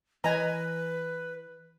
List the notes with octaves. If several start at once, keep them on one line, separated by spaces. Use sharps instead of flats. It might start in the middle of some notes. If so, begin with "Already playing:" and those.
E3 B4 D#5 G#5 A#5